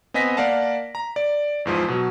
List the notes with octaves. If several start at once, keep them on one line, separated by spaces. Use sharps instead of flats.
B3 C4 D#5 G#5 A#6 B6
A#3 D5 F5 F#5 A5
A#5
D5
E2 G#2 F3
B2 F#3